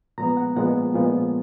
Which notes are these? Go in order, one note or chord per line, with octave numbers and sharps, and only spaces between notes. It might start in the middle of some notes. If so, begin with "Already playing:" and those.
A#2 F3 G#3 B3 A#5
F#5
A#2 F3 G#3 B3 F#5
A#2 F3 G#3 B3